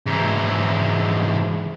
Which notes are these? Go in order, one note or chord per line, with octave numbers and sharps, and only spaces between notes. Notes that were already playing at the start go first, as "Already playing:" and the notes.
G#2 E3